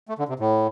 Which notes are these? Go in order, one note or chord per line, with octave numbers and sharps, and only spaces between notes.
A3
D3
C3
A2